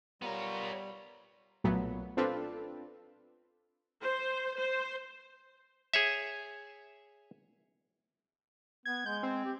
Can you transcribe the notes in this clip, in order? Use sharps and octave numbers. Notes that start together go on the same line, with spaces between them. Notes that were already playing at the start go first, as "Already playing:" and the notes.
G3 B3 F4 A#4 C#5
B1 A#2 F#3 A3 B3
C4 D4 F4 A4 B4
C5
C5
G#4 C#5 E5
B3 G#6
G#3 G6
C4
G4